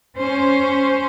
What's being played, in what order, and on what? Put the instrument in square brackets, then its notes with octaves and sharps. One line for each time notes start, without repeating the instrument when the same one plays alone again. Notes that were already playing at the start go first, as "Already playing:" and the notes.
[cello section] C#4 C5